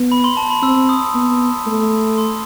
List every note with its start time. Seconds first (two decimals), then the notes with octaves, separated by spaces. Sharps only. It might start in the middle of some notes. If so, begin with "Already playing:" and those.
Already playing: B3
0.12 B5
0.24 C6
0.37 A5
0.50 B5
0.62 C4 E6
0.89 D#6
1.14 B3
1.66 A3
2.18 C6